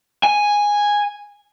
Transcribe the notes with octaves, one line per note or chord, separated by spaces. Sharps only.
G#5